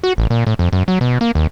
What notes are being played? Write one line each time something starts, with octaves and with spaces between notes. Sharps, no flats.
F#4
A1
A#2
A2
F2
F#2
F#3
B2
A#3
D#2